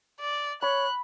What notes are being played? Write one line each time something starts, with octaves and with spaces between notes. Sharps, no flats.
D5
C#5 B5 F#6